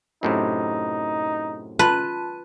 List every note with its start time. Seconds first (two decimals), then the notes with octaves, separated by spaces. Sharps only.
0.23 F#2 A2 C3 D#4
1.79 F4 B4 A5 D#7